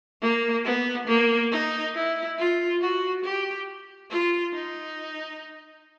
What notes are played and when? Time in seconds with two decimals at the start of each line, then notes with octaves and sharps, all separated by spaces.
0.22 A#3
0.65 B3
1.07 A#3
1.52 D#4
1.95 E4
2.38 F4
2.82 F#4
3.24 G4
4.11 F4
4.54 D#4